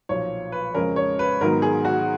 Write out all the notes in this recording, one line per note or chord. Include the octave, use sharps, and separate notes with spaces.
B1 A#2 F3 C#5
B4
F2 C#3 G#3 C#4 A#4
C#5
B4
G#2 D#3 F#3 B3 A#4
G#4
F#4